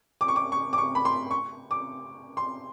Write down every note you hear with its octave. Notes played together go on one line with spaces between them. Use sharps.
D6
C#6
D6
C#6
D6
C#6
B5
C6
C#6
D6
C6